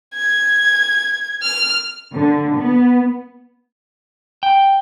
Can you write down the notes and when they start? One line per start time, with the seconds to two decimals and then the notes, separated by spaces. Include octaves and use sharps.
0.14 G#6
1.43 F6
2.13 D3
2.57 B3
4.43 G5